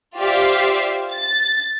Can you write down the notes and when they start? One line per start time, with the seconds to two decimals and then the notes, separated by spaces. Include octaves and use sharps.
0.17 F4 G4 C5 D5 E5 F5
1.11 A6